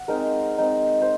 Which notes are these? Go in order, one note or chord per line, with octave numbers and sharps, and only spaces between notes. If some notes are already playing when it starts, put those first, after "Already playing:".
Already playing: F#5
G#3 C4 D#4 A#4
G#3 C4 D#4
C5